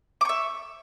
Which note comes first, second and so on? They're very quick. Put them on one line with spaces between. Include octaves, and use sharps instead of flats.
D6 C#6 E5